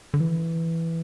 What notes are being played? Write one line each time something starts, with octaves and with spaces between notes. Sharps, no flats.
D3
E3